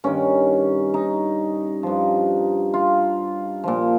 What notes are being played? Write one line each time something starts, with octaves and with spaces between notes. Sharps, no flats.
G2 D#3 C#4
D#4
G2 F3
F4
A#2 F3